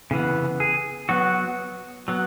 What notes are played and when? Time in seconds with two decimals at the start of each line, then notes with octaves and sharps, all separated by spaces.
0.11 C#3 E3 B3
0.60 G#4
1.09 F#3 B3 F#4
2.08 F#3 B3